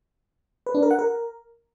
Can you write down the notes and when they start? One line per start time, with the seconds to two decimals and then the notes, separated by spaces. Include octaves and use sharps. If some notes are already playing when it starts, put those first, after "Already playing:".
0.66 B4
0.75 D4
0.83 A#4
0.91 F#5
0.99 A#4